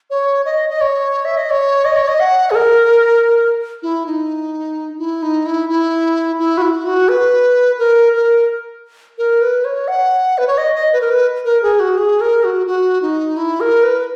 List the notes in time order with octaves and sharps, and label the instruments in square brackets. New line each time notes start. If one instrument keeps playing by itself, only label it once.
[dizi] C#5
D#5
D#5
C#5
E5
D#5
C#5
D#5
C#5
D#5
F#5
G#4
A#4
E4
D#4
E4
D#4
E4
E4
E4
F#4
E4
F#4
B4
A#4
A#4
A#4
B4
C#5
F#5
B4
C#5
D#5
D#5
B4
A#4
B4
A#4
G#4
F#4
G#4
A#4
F#4
F#4
D#4
E4
A#4
B4